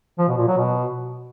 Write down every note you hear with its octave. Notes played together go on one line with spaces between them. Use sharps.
F3
B2
A#2
F#3
B2